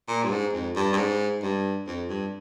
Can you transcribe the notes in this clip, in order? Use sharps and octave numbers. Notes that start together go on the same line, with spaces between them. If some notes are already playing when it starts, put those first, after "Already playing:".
A#2
G2
G#2
F2
G2
G2
G#2
G2
F2
G2